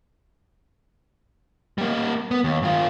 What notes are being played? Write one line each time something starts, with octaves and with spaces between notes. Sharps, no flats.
G3 A#3
B3
D#2
G2 F4